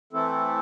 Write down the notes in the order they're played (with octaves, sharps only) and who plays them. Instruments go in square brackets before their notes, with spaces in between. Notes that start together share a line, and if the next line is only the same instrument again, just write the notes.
[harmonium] E3 A3 C4 E4 A4